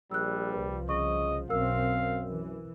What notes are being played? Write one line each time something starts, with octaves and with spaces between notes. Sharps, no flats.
A#1 G3 E6 F#6
C2 F3 B4
C#3 D#5 C#6
B1 F#2 C4 A#4 F5 E6
E3